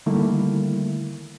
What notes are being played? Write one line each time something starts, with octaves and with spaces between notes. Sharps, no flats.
D3 D#3 G3 A3 A#3 E4